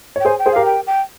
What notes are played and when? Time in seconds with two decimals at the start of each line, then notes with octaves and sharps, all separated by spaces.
0.16 C#5
0.20 G5
0.25 G#4 C5 G#5
0.39 G5
0.46 G#4 C5
0.52 G4 A#4 F5
0.66 G5
0.87 G5